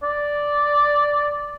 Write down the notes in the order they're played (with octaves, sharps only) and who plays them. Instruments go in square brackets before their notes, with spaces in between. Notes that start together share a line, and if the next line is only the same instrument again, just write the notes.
[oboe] D5